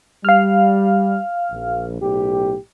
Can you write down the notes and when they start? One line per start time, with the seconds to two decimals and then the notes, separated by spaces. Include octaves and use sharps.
0.25 G3 F5 F6
1.51 A#1
2.01 B1 A2 G4